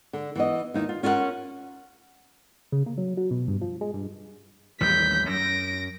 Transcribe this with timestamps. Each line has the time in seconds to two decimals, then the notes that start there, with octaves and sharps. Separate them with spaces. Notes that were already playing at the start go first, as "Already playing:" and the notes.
0.13 D3
0.36 E3 B3 D#5
0.74 D#2 D#4 E4
0.89 F4
1.03 C#4 F4 A#4 E5 F#5
2.72 C#3
2.86 A#3
2.98 F#3
3.17 F#3
3.31 B2
3.48 G2
3.61 F3
3.81 G#3
3.94 G2
4.80 A1 D#2 G3 G6 B6
5.29 F#2 A#6 D7